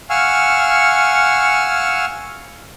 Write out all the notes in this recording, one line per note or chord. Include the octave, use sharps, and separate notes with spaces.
F5 F#5 G#5 C#6 E6 F6